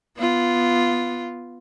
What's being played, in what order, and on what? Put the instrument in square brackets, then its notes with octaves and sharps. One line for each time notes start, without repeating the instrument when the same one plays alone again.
[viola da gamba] B3 F4